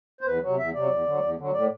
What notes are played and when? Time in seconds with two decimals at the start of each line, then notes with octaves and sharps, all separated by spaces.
0.21 C5
0.26 E2 B4
0.42 C3 F#3
0.58 E2 E5
0.74 C3 F#3 D5
0.90 E2
1.06 D3 F#3
1.22 E2
1.37 D3 F#3
1.54 A2 D5